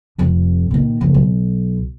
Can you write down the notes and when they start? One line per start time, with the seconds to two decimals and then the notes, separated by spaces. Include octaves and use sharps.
0.18 F1 F2
0.71 A#2 D#3
1.01 F#1 F3
1.14 B1